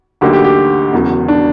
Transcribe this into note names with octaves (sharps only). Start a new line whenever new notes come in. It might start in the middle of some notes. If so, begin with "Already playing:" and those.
D2 D3 F#3 A#3 D#4 G4
G4
G4
E1 E2 C#3 F#3
D4